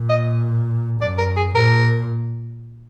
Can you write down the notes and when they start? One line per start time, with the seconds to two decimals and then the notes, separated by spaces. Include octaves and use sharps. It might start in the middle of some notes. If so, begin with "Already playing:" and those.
Already playing: A#2
0.09 D#5
1.00 F#2 D5
1.18 A#4
1.36 G#4
1.55 A#2 A#4